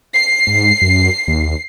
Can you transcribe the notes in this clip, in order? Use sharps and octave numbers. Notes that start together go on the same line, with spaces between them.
C7
G#2
F#2
D#2